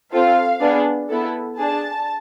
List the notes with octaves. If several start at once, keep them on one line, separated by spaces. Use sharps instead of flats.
C4 F4 A4 F5
B3 D4 G#4
B3 E4 A4
D4 G#4 A5